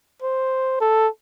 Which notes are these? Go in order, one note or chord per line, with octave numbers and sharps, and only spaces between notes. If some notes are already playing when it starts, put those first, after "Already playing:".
C5
A4